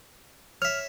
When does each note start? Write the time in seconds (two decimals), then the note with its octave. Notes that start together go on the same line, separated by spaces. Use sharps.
0.62 C#5 E5 F6